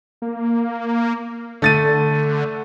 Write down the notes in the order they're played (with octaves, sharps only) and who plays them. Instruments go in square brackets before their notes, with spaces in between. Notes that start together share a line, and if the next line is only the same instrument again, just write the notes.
[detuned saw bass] A#3
[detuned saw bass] D3 [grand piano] A3 A6 D#7